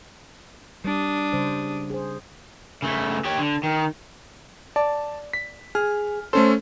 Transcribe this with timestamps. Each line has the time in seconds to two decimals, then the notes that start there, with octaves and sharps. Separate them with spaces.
0.85 G3 D4 D#6
1.33 C#3 G3 C5
1.90 G#4 C5
2.82 C#3 A3
3.24 G4 C#5
3.37 D3
3.63 D#3
4.76 D5 A5
5.33 B6
5.75 G#4 F6
6.33 A3 C#4 A4 C5